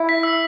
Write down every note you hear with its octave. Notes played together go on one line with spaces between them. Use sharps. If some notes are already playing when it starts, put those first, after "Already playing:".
Already playing: E4
B6
E6